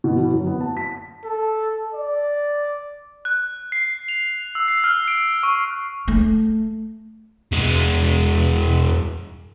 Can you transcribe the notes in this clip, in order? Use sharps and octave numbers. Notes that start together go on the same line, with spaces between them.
B2
E3
F#2
B3
A5
B6
A4
D5
F#6
C7
F7
E6
C7
F6
D7
C#6
A3
E2 G#3